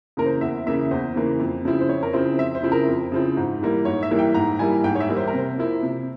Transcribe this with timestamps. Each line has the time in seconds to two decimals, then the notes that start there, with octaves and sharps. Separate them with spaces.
0.17 C#3 E3 A#3 A#4
0.26 C5
0.41 E2 E5
0.67 C#3 E3 A#3 E5
0.91 E2 C5
1.15 C#3 E3 A#3
1.40 F2
1.65 C#3 F3 C4 E4
1.81 C5
1.89 F2 C#5
2.03 A#4
2.13 C#3 F3 C4 E4 C5
2.38 F2 E5
2.55 C5
2.63 C#3 F3 C4 E4
2.72 A#4
2.88 F2
3.12 C#3 F3 C4 E4
3.37 G#2
3.62 E3 G3 A#3 E4
3.85 G#2 C#5
4.03 E5
4.11 E3 G3 A#3 E4
4.19 G5
4.34 G#2 A#5
4.59 E3 G3 A#3 E4 G#5
4.84 G#2 G5
4.95 C#5
5.00 E5
5.09 E3 G3 A#3 E4
5.17 C5
5.27 A#4
5.33 C3 C5
5.58 F3 A#3 E4
5.83 C3